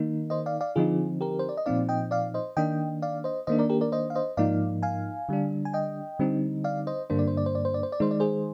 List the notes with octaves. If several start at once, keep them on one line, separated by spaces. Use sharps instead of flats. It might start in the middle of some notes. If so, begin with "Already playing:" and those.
Already playing: D#3 A#3 D#4
C5 D#5
D5 F5
D5 F5
D3 F3 C4 D#4 F4 G#4
G4 A#4
C5
D5
D#5
A#2 F3 C4 D#4 D5 F5
D#5 G5
D5 F5
C5 D#5
D#3 A#3 D4 D#5 G5
D5 F5
C5 D#5
D#3 A#3 D4 C5 D#5
A#4 D5
G4 A#4
A#4 D5
C5 D#5
F5
C5 D#5
G#2 F3 A#3 D#4 D5 F5
F5 G#5
D3 G3 D4
G#5
D#5 G5
D3 G3 C4 D#4
D5 F5
C5 D#5
G2 D3 G3 A#3 D4 C5
D5
C5
D5
C5
D5
C5
D5
C5
D5
D#3 G#3 D#4 C5
D5
G#4 C5